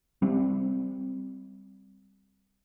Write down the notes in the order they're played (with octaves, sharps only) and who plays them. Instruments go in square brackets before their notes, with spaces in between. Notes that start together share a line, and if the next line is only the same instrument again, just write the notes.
[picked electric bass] G3 C4